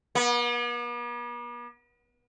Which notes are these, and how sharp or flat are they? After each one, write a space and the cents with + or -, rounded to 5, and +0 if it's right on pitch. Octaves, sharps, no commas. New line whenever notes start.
B3 -45